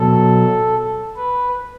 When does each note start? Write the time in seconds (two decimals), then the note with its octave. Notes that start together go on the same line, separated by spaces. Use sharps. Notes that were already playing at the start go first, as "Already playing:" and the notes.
Already playing: B2 F#3 A4
1.17 B4